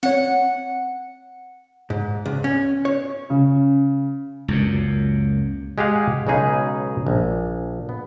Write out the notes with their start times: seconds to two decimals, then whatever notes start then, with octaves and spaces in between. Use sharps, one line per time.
0.03 C4 C#5 F#5
1.90 G#2
2.26 C#2
2.44 C#4
2.85 C#5
3.30 C#3
4.48 C#2 F#2 A#2
5.78 G#3 G4 G#4 F5 F#5
6.27 B1 C#3 G#3 D#4 G#4 B4
7.07 A#1
7.89 B3